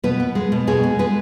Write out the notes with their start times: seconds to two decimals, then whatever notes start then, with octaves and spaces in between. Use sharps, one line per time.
0.04 B2 B3 B4
0.20 B3
0.35 G#3
0.52 B2
0.67 B2 G#3 G#4
0.83 B3
0.99 G#3 B3 B4